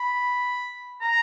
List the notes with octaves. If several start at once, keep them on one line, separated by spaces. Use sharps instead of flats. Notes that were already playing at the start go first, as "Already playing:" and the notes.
Already playing: B5
A#5